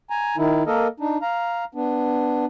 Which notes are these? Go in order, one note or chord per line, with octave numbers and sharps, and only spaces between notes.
G#5 A#5
D#3 D#4 E4
A#3 A4 A#4 D#5
D4 D#4
F5 A#5
B3 D4